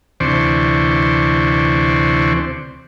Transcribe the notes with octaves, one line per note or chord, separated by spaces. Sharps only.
D2 C3 E3 C5 D5 C#6